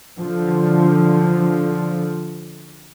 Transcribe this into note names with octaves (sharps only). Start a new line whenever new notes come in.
D3 F3